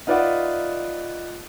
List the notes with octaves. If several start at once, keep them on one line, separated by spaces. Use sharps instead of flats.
D#4 F4 B4 D5 E5 F#5